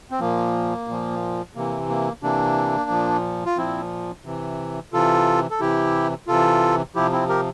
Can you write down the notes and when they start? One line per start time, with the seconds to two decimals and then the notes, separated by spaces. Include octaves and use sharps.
0.11 C4
0.20 A#2 F3 A#3
0.88 A#2 F3
1.55 C3 E3 A#3
1.89 A#3
2.22 C3 E3 A#3 D4
2.90 A#2 F3
3.46 F4
3.57 A#2 F3 C4 E4
4.25 C3 E3
4.93 C3 E3 F4 A4
5.51 A4
5.60 C3 E3 E4 G4
6.27 C3 E3 F4 A4
6.95 C3 F3 E4 G4
7.12 C4 E4
7.29 G4 A#4